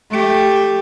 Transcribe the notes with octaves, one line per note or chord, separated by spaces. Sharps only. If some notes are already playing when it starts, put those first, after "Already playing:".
A3 G4